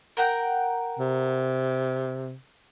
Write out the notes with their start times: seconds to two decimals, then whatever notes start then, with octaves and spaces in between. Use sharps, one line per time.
0.17 A#4 F#5 G5
0.99 C3